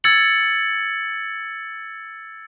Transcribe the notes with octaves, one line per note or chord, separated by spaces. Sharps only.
E6 G#6 A6 C#7 F#7